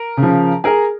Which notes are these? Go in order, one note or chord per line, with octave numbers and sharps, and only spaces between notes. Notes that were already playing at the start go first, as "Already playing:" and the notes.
Already playing: A#4
C#3
F3
G#4 A#4